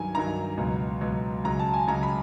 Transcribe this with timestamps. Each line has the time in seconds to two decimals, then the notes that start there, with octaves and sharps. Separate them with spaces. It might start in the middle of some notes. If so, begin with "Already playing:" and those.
Already playing: G2 D#3 F#3 G#5
0.15 G2 D#3 F#3 A#5
0.57 C#2 B2 F#3
1.01 C#2 B2 F#3
1.44 C#2 C#3 F#3 A#5
1.59 A5
1.74 G#5
1.87 C#2 C#3 F#3 A#5
2.03 B5